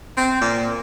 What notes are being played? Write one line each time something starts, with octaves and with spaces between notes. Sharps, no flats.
C4
A#2